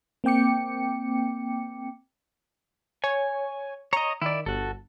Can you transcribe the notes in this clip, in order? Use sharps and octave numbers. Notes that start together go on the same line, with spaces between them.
A#3 C4 G5 D6 C#7
C#5 G#5
C#5 D#5 A#5
D#3 E4 D5
G1 F#4 A4